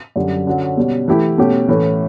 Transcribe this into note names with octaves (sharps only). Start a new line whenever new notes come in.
F#2 D3 G3
D3 F#3 C#4
B2 G3 C#4
E3 A3 E4 G4
B2 A3 C#4 G4
A2 E3 A3 C#4